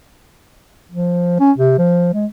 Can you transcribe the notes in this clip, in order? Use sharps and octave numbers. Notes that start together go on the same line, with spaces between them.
F3
C#4
C3
F3
G#3